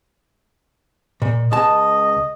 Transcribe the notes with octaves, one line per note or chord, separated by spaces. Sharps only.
A#2
C#2 D#5 A5